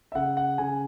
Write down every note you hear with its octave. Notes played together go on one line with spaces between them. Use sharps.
E5
C#3 F#5
F#5
C#3 G#5